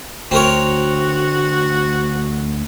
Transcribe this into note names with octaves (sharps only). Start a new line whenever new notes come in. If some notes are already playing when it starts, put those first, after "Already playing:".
D2 C4 F#4 A#4 C#5